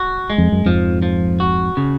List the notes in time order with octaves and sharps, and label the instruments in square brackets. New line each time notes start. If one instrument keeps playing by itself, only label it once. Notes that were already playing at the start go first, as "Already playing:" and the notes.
Already playing: [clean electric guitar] F#4
G#3
[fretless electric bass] F2
F#2
[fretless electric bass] F2 G#2 [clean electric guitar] F3
[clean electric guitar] F3
F#4
C#3